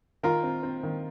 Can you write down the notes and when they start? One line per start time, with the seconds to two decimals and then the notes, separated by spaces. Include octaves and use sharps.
0.23 D#3 F4 A#4
0.43 C4
0.63 C4
0.83 D#3